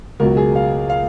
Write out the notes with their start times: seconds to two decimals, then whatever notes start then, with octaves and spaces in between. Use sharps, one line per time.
0.20 C#2 B2 F#3 A#4
0.37 G#4
0.56 F5
0.90 F5